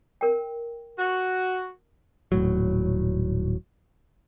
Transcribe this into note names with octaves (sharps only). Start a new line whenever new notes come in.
A#4 G5
F#4
D#1 A2 F#3